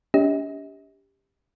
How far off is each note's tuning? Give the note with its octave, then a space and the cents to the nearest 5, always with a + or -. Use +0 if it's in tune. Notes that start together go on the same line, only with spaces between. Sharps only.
D4 -45 G4 +10 D#5 +45